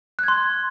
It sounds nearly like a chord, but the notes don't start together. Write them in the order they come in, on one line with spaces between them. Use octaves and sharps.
F#6 G#6 C6